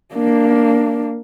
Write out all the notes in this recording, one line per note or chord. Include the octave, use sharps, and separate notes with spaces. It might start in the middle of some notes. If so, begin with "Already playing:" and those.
A#3 D4